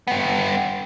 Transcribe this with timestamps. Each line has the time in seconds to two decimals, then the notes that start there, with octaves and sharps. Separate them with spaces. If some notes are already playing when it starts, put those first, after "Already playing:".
0.07 G2 B3